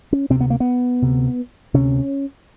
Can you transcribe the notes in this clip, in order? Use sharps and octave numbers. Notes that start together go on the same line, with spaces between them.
C#4
D2 C3 C4
B3
A#3
B3
D2 C3
D2 C3 C#4